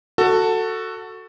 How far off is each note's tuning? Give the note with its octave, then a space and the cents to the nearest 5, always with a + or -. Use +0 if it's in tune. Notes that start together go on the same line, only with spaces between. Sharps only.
F#4 +0 A4 +15